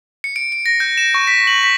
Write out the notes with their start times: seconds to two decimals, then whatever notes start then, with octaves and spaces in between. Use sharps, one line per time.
0.24 C#7
0.36 D7
0.52 D7
0.66 A#6
0.80 G6
0.97 E7
1.14 C#6
1.27 B6
1.47 F#7
1.63 B6